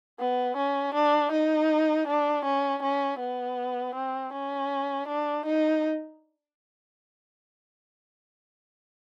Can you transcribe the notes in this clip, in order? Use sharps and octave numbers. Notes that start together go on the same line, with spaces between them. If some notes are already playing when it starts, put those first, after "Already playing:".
B3
C#4
D4
D#4
D4
C#4
C#4
B3
C4
C#4
D4
D#4